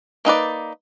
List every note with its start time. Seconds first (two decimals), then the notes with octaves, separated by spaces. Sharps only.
0.25 A#3 D#4 B4 D5